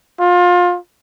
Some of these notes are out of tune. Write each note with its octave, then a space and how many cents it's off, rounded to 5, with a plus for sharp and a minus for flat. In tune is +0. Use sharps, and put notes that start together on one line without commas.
F4 +25